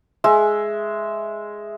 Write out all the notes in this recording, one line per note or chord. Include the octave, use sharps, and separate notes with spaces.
G#3 E5